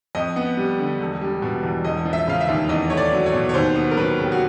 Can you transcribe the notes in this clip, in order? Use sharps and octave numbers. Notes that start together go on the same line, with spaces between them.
F2 D#5
B3
G3
D3
E1
G3
B2
E2
E1 D#5
F3
E5
C#3 F5
E5
D#2
E2 D#5
A3 C#5
D5
F#3
C#5
B2
C#5
D#2 C5
B3
A#4
F#3 B4
C#3
G4
F#4